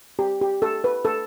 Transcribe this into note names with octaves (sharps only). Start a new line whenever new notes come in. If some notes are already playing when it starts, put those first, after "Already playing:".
G4
G4
A4
B4
A4